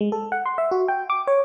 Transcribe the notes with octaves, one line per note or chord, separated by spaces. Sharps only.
G#3
A4
F#5
C6
E5
F#4
G5
D6
C#5